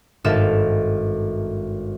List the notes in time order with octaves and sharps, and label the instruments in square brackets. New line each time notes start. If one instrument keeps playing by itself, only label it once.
[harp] G#1 G2 A4 E5 F5 E7